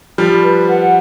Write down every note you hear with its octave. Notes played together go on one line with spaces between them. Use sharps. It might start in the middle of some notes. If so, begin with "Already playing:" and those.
F3 G3 B5
B4
F#5